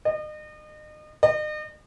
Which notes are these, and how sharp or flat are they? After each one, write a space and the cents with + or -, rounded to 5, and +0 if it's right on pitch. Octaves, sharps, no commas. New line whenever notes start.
D#5 -35
D#5 -40